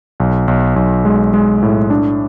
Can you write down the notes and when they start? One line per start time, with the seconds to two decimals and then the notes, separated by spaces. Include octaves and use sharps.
0.20 B1
0.48 B1
0.76 B1
1.05 G#3
1.34 G#3
1.63 A2
1.90 D4